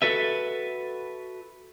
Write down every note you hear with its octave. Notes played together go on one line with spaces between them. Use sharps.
F#4 A4 B4 E5